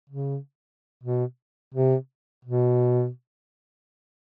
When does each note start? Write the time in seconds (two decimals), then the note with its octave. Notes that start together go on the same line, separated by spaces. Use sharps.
0.09 C#3
1.03 B2
1.74 C3
2.45 B2